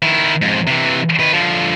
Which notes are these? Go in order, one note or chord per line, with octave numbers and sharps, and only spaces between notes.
D#3 E4
F2 G#2
C3 E3
D#3 B4
D3 F3